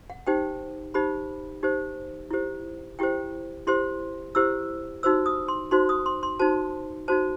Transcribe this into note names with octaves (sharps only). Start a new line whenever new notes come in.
F#5
D#4 G4 C5 G5
D#4 G4 C5 B5
D#4 G4 C5
E4 G4 C5
E4 G4 C5 G5
E4 G4 C5 C6
E4 G4 C5 E6
D#4 F#4 C5 E6
D#6
C6
D#4 F#4 C5 C6
D#6
C6
C6
D#4 F#4 C5 A5
D#4 F#4 C5 A5